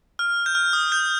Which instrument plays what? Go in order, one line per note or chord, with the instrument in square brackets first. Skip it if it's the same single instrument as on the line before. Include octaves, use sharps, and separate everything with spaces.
[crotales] F6
G6
F6
D#6
G6